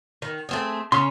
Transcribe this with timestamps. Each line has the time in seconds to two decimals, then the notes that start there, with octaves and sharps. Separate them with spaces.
0.22 D#3
0.49 A3 C4 G#4
0.92 C#3 C#4 C6